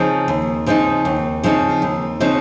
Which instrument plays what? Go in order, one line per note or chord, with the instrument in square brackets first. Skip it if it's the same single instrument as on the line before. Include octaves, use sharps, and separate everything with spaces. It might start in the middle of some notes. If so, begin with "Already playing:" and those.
Already playing: [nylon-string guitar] C#3 F3 C4 D#4
D#2
C#3 F3 C4 D#4
D#2
C#3 F3 C4 D#4
D#2
C#3 F3 C4 D#4